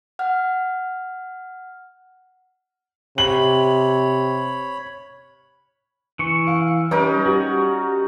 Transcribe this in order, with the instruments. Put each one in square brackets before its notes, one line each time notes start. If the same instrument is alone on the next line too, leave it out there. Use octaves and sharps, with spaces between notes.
[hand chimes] F#5 F6
[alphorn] C3 [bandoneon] C#5 B5 [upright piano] F#7
[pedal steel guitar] E3 C#6
[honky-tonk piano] F5
[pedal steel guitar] G3 [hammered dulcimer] C#4 D#4 A#4 [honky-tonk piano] B4
[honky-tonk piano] G3 [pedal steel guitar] F#4